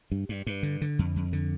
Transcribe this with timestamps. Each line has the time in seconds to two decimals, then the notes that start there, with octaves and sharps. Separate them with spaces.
0.11 G2
0.29 G2
0.47 G2
0.63 D3
0.81 D3
0.99 F2
1.16 F2
1.33 D3